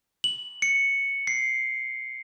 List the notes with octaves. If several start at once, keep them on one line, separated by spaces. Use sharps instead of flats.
F#7
C#7
C7